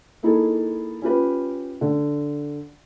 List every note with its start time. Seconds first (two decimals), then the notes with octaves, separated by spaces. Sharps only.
0.23 A#3 D#4 E4 G#4 A4
1.02 C#4 F4 G4 B4
1.81 D3